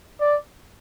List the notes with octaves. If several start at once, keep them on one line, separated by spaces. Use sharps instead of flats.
D5